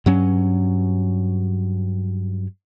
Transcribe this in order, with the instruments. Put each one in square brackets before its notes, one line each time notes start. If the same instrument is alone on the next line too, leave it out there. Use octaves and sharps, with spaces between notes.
[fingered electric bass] G2 F#3 C#4